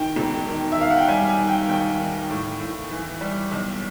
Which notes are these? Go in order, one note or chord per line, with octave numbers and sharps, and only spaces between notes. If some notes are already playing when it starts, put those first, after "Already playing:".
Already playing: D#3 G5
E1
D#3
E5
D#3 F5
F#5
G5
G3 G#5
G#5
D#3
G5
D#2 G5
D#3
A2
A2
E3
G3
B1